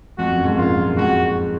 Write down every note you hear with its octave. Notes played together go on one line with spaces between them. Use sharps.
F2 F#4
F#2
F2 G#2
F#2 A#2 F4
F#2
F#2
F2 G#2 F#4